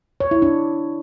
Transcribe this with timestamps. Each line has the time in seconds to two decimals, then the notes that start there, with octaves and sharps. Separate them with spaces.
0.20 C#5
0.31 E4
0.42 D4